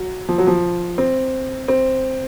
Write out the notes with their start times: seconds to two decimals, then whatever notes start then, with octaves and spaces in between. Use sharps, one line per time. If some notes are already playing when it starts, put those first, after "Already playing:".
Already playing: F#3
0.29 F3
0.38 F#3
0.47 F3
0.98 C4
1.68 C4